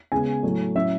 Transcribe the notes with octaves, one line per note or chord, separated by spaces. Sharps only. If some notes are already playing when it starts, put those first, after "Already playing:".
C#3 G#3 B3 G#5
A2 F#3 A3
A2 F#3 C#4 E5